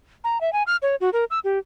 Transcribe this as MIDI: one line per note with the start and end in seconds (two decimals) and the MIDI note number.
0.24 0.40 82
0.41 0.52 76
0.53 0.63 80
0.67 0.76 89
0.82 0.95 73
1.01 1.10 66
1.13 1.24 70
1.30 1.39 88
1.44 1.58 67